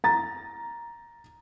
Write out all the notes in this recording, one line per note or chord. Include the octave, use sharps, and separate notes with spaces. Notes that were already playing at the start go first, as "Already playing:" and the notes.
A#5 A6